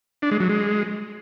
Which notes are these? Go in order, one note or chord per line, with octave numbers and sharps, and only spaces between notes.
D4
G#3
F#3
G#3